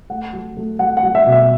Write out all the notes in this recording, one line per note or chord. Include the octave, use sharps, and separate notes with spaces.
A3 F#5
F#3
A3
F#3 F#5
F#5
F#3
E5
B2
E5